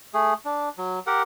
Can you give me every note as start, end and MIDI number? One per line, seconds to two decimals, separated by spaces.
0.14 0.34 57
0.14 0.34 68
0.45 0.69 62
0.78 0.99 54
1.07 1.23 67
1.07 1.23 70
1.07 1.23 78